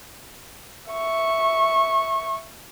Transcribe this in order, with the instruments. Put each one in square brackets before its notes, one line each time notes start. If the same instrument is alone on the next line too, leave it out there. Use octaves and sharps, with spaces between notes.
[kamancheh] E5 C#6